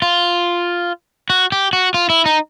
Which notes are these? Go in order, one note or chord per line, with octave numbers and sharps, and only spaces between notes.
F4
F#4
G4
F#4
F4
E4
D#4